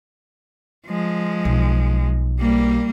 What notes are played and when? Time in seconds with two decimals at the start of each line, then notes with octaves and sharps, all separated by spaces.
0.86 F3 G#3
1.45 B1
2.40 G3 A#3